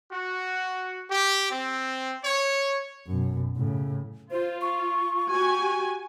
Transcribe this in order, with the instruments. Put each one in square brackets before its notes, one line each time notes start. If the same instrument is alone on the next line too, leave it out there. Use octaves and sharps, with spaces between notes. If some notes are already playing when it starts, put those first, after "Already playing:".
[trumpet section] F#4
G4
C4
C#5
[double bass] F#2 B2
A2 C#3
[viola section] F4 [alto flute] C5
[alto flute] C#6
[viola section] F#4 G4 G#5